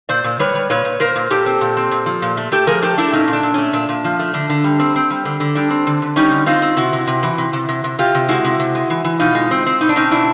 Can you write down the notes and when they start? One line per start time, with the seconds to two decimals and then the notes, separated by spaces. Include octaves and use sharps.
0.09 A#2 C5 D5
0.24 A#2
0.39 G3 B4 C#5
0.55 G3
0.70 A#2 B4 C#5
0.85 A#2
1.00 A#2 A#4 C5
1.16 A#2
1.30 A#2 G4 A4
1.46 C4
1.61 A#2
1.77 C4
1.91 A#2
2.06 F3
2.22 A#2
2.37 A3
2.52 A3 G4 A4
2.67 F3 G#4 A#4
2.82 A3 G4 A4
2.98 A3 D4 E4
3.12 A#2 C#4 D#4
3.28 A#2
3.33 D4
3.43 A#2
3.54 A3 C#4
3.73 A#2 D4
3.89 A#2
4.04 F3
4.19 A3
4.34 D3
4.50 D3
4.64 G3
4.79 C4
4.96 C4
5.11 G3
5.25 D3
5.40 D3
5.55 G3 D4
5.70 C4
5.87 D3
6.02 D3
6.16 G3 C#4 D#4
6.31 D3
6.46 C4 D#4 F4
6.62 C4
6.77 C3 E4 F#4
6.93 C3
7.07 C3
7.23 E3
7.38 C3
7.53 C3
7.69 C3
7.84 C3
7.99 C3 F4 G4
8.15 C3
8.28 G#3 E4 F#4
8.45 C3
8.59 C3
8.75 G#3
8.90 E3
9.04 E3
9.20 B2 D#4 F4
9.35 G#3
9.51 C4
9.66 C4
9.81 B2 D#4
9.89 D4
9.96 C4 C#4 D#4
10.11 B2 D4 E4